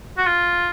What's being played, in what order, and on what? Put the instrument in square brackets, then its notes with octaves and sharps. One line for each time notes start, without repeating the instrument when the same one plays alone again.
[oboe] F#4
F4